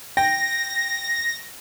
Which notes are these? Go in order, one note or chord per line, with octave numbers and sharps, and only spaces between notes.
G5 A#6